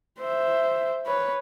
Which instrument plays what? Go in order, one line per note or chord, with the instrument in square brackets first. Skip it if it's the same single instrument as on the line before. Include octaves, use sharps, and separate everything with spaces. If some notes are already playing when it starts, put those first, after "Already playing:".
[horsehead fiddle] C5 E5
B4 C#5